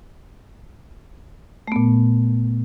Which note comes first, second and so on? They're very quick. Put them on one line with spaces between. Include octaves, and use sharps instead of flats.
A3 B3 A#2